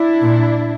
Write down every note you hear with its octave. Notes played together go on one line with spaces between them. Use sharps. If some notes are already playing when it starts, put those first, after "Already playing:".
Already playing: D4 E4
A#2